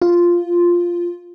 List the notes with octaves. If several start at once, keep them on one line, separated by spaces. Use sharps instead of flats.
F4